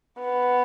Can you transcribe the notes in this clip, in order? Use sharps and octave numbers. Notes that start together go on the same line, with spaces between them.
B3